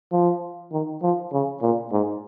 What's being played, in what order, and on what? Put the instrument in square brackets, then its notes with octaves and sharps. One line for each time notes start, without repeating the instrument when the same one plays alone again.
[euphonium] F3
D#3
F3
C#3
A#2
G#2